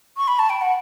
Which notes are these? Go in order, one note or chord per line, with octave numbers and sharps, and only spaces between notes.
C#6
B5
A5
G5
F#5